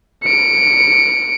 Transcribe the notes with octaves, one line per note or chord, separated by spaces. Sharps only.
C#7 D7